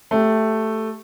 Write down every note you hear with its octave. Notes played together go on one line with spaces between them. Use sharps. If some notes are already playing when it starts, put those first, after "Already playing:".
A3 G4